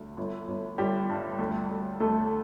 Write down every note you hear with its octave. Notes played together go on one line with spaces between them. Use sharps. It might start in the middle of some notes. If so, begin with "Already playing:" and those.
Already playing: D2
G1
G1
G1 G3 G4
G2
D2
D2
D2 A3 A4